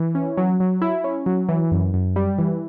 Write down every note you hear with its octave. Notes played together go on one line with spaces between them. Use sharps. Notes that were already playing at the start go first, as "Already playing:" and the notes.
Already playing: E3
C#4
F#3
F#3
E4
C#4
F#3
E3
F#2
F#2
G3
E3